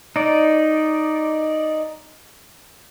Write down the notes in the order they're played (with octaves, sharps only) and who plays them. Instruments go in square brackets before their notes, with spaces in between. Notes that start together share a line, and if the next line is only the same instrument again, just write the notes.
[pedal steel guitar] D#4 D5